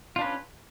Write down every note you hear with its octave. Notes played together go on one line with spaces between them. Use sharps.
C#4 D4 F4 B4